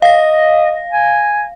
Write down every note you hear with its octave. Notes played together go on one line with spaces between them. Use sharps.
D#5 F5 A#6
G#5